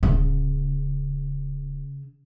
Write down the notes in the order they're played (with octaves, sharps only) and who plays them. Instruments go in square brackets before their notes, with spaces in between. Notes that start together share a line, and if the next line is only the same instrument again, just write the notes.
[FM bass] D1 [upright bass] C#3